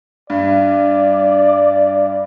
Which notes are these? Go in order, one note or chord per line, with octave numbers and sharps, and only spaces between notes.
G2 D5